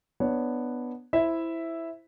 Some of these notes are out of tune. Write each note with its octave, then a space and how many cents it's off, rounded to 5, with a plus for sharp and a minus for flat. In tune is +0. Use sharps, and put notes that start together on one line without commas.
B3 +0 D4 +15 C#5 +0
E4 +0 C5 +0 E5 +0